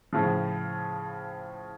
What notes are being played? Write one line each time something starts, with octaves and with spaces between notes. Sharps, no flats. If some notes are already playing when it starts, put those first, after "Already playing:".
A2 C#3 F3